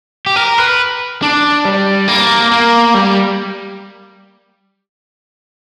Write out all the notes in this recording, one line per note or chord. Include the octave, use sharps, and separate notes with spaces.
G4
A#4
B4
D4
G3
A#3
A#3
G3